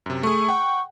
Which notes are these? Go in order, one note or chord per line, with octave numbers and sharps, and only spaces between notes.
F#2 C3
A3 G#4 C#6
F#5 G5